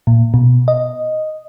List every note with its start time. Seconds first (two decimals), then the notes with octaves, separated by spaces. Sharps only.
0.07 A#2
0.34 B2
0.68 D#5